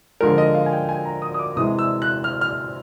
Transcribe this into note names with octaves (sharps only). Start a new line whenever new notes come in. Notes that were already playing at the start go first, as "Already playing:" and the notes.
D3 F3 G#3 A#4
D#5
F5
G#5
G5
G#5
A#5
D#6
D#6
D6
C3 E3 G#3 D#6
E6
F#6
F6
F6